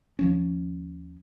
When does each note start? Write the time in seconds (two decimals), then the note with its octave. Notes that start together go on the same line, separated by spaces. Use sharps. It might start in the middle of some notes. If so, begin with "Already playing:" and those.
0.19 D#2 F3 C#4